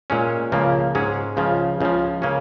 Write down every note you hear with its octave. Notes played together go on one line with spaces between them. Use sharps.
A#2 G#3 C#4
C#2 C#3 F3 A#3
G#2 G#3 C#4
C#2 C#3 F3
C#2 C#3 F3
C#3 A#3 C#4